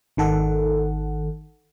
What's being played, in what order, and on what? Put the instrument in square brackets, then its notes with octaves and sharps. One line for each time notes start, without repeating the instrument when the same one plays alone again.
[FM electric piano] G#1 D#3 A4 F#5